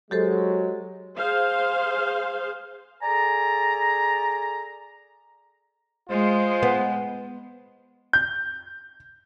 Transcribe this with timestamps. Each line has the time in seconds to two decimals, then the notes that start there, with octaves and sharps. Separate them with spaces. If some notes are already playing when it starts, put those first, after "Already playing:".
0.11 F#3 G#3 G4 A4 C5
1.18 G#4 C5 F5
3.03 G#4 A4 D5 G#5 A#5
6.09 G#3 F4 C5
6.63 B3
8.13 G6